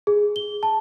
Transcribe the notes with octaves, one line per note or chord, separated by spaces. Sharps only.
G#4
G7
A5